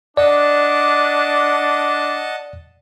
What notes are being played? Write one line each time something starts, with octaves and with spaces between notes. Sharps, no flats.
D4 D5 D#5 F#5 A5